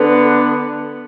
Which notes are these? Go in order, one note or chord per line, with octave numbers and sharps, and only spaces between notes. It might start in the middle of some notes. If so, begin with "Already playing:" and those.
Already playing: D3 B3 D4